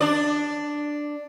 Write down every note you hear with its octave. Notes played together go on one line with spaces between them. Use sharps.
D4 D5